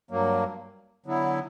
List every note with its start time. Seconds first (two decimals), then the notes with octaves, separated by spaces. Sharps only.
0.11 G2 F#3 A#3
1.06 D3 F#3 B3 E4